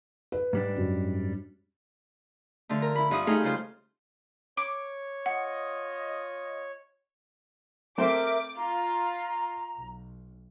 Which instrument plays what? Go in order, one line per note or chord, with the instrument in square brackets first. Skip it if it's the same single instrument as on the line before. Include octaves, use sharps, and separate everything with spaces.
[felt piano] B4
[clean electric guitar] G#2 G3 D4
[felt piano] F#2
[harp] D3 F3 A3
A#4
E4 B5
G2 F3 E4 F#5 D#6
A3 D#4 G#4 F5 G5
C#3 G3 F4 C5
[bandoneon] C#5 [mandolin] D6
[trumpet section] F4 D#5 [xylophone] F#5
[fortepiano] A3 C4 C5 [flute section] A#4 E5 [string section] D6
[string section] F4 [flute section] A#5
[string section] B1